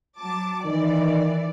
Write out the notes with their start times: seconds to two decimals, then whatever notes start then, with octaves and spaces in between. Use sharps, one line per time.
0.18 F#3 A5 D6
0.65 D#3 E3 D5